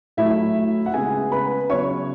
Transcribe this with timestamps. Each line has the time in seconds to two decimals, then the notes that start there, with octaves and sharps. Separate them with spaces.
0.17 A2 F#3 A3 E4 E5
0.86 F#5
0.94 C#3 G#3 B3 G#4 G#5
1.32 B4 B5
1.70 C#3 F#3 B3 C#5 C#6